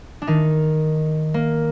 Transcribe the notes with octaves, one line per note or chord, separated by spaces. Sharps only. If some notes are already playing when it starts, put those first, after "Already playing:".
D4
D#3 D#4
A#3